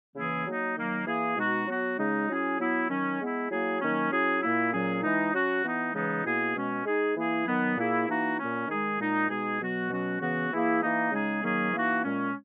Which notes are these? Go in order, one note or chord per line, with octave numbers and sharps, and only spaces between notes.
C#3 E3 A#3 E4 G#4
F#3 A#3 D#4
D#3 F#3 A#3
E3 A#3 E4 G#4
B2 G#3 D#4 F#4
F#3 B3 F#4
C#3 G#3 D#4
F#3 C#4 E4 G#4
F#3 B3 E4
D#3 F#3 C#4
G#3 B3 E4
F#3 A#3 E4 G#4
D#3 F#3 A#3 C#4
F#3 C#4 E4 G#4
A#2 A#3 E4
A#2 F#3 C#4 G#4
E3 G#3 D#4
F#3 C#4 F#4
E3 B3 D#4
C#3 E3 G#3 B3 D#4
B2 A#3 E4 G#4
B2 G#3 C#4
G#3 D#4 G#4
E3 A#3 E4 G#4
D#3 F#3 B3
A#2 A#3 E4 G#4
E3 A#3 D#4 F#4
A#2 A#3 C#4
D#3 G#3 D#4 G#4
A#2 G#3 D#4
B2 G#3 D#4 G#4
B2 F#3 B3 F#4
B2 F#3 C#4 F#4
C#3 E3 B3 F#4
E3 A#3 E4 G#4
E3 A#3 D#4
C#3 G#3 D#4 G#4
D#3 F#3 A#3 C#4 G#4
E3 A#3 D#4 F#4
A#2 G#3 C#4